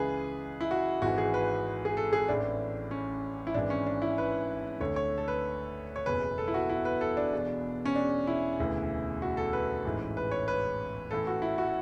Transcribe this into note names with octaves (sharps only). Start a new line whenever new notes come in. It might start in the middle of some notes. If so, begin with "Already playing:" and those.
Already playing: C#2 C#3 E3 G#4 B4
E4
F#4
G#1 G#2 E3 F#4
G#4
B4
G#4
A4
G#4
A1 A2 E3 D4
C#4
E4
G#1 G#2 E3 D4
C#4
D4
E4
B4
D2 D3 C#5
C#5
A4
B4
C#5
F#1 E2 B2 B4
A4
E4
F#4
E4
B4
A4
D4
E1 E2 B2
C#4
D4
E4
E1 D2 C#3 E3
F#4
A4
B4
A1 G#2 E3
B4
C#5
B4
A1 A2 E3 A4
F#4
E4
F#4